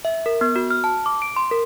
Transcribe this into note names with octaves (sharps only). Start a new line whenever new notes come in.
E5
A#4
B3
F#4
F6
A5
D6
D7
C6
A#4